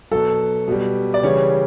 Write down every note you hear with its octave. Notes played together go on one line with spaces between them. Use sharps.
B2 F#3 A4
B2 G3
D5
C#3 E3 G3 C#5